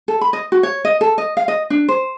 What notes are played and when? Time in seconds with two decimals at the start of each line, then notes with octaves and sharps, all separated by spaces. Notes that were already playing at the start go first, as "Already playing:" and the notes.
0.08 A4
0.21 B5
0.33 D#5
0.52 F#4
0.63 C#5
0.85 D#5
1.01 A4
1.18 D#5
1.37 F5
1.48 D#5
1.70 D4
1.88 C5